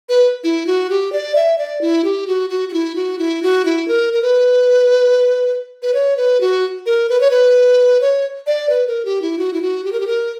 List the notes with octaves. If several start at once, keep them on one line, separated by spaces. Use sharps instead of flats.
B4
E4
F#4
G4
D5
E5
D5
E4
G4
F#4
F#4
F#4
E4
F#4
E4
F#4
E4
A#4
A#4
B4
B4
C#5
B4
F#4
A#4
B4
C#5
B4
C#5
D5
B4
A#4
G4
E4
F#4
E4
F#4
G4
A#4
G4
A#4